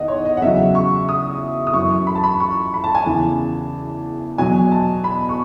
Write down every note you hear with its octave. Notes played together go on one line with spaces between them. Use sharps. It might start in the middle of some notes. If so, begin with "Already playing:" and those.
Already playing: E2 D#3 D#5 F#5
C#5
D#5
F#5
E2 C#3 F#3 E5
C#6
D#6
D#6
F#2 E3 C#6
B5
A5
B5
C#6
B5
A5
G#5
E2 C#3 E3 A5
E2 B2 F#3 G#5
A5
B5
C#6